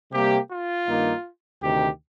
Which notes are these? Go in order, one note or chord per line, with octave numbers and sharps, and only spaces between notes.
C3 G3 A#3 G4
F4
G2 D#3 A#3 D#4
D2 C3 D#3 G4